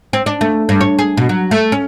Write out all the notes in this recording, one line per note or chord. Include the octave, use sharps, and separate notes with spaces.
C4
D4
A3
G2
C#5
G#4
B2
F#3
A3
C#4